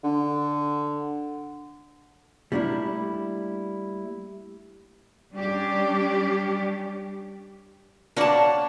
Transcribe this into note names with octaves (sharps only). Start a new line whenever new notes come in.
D3
G3 A3 A#3 D4 E4
G3 C#4 D4 G4
A#3 D4 C#5 F#5 A5